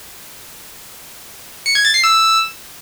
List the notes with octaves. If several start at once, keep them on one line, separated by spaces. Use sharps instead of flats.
C#7
G#6
A6
C7
E6